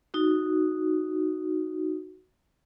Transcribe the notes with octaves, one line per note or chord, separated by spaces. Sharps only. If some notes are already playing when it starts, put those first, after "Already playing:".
D#4 F#4